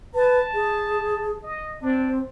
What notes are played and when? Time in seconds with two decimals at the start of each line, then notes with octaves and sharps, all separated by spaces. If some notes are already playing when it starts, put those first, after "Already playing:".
0.15 B4 A5
0.54 G#4
1.43 D#5
1.82 C4 D4